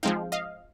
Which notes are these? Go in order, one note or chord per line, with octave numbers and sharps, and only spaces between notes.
F3 G#3 C4 D#4 F5 G5
D#5 F5